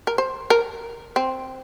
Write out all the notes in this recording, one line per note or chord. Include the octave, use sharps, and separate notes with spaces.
A#4
C5
A#4
C4